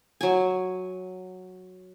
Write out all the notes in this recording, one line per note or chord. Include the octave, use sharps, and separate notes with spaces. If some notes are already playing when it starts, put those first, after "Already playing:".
F#3 G#5